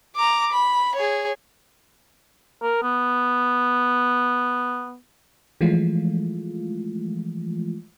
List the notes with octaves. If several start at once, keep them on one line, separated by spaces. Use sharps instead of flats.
A#5 D6
B5
G#4 C#5
A#4
B3
E3 F3 G#3 A3 F4